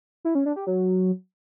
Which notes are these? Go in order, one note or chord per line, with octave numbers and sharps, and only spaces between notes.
E4
C#4
D4
G4
F#3